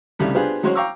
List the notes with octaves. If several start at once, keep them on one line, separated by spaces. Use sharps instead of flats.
C2 C#3 G3 A3
B3 D4 F4 G4 G#4 C5
F#3 G#3 C#4 F#4 C5 C#5
F5 G5 A#5 C#6 D6 E6